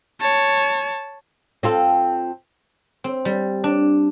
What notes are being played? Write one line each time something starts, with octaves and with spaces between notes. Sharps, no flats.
C#5 A5
C4 F4 A4
C4
G3
D4